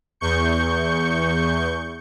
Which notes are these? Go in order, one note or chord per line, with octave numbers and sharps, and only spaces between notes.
E2 C#6 G6 C#7